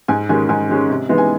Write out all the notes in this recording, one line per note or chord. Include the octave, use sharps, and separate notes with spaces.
G#2 G#5
D#3 G#3 C#4 G#5
G#2 G#5
D#3 G#3 C#4
C3
E3 G#3 B3 D#4
G#5